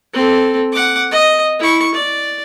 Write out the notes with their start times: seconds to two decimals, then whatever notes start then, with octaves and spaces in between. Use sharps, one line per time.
0.13 C4 A4
0.73 F#5 D6
1.11 D#5
1.59 E4 C#6
1.94 D5